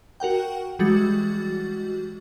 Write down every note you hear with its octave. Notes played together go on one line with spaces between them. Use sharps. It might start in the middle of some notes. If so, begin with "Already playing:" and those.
F#4 A#4 F#5 G5
E3 G3 G#3 F#4 A6